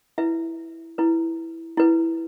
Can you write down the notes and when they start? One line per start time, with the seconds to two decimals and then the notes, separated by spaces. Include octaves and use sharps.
0.18 E4 B4 E5
0.98 E4 B4
1.77 E4 B4